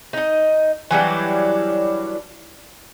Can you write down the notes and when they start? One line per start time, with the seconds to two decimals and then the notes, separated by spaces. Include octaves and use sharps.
0.13 D#4 D#5
0.91 E3 F#3 G3 D4